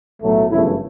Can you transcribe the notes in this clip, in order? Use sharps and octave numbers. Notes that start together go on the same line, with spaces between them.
B1 A2 F#3 A3
G1 F#2 C#3 E3 A3 E4